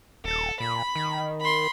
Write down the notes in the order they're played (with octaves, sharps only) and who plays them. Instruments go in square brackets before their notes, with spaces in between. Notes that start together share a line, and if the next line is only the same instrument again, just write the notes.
[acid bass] D#1 [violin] A4
[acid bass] A#2 [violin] B5
[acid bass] D#3
[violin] B5 C6